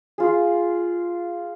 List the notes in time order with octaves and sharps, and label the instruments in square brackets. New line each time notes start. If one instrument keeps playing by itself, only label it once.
[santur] F4 G#4